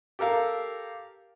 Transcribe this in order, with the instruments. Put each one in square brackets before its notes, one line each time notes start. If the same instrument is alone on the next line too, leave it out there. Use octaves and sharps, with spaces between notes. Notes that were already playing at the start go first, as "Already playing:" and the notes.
[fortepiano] G4 A4 A#4 F5